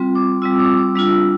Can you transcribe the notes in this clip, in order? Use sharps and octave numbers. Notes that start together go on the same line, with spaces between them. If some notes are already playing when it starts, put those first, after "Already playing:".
Already playing: G3 C4 F4
D6
G3 C4 F4 E6
D6
D6
G3 D4 F4 E6